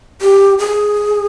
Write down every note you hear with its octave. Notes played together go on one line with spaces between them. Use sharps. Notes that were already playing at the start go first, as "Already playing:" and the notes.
G4
G#4